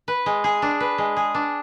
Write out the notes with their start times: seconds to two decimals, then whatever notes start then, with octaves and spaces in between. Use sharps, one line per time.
0.08 B4
0.26 G#3
0.44 G#4
0.62 D4
0.80 B4
0.98 G#3
1.17 G#4
1.34 D4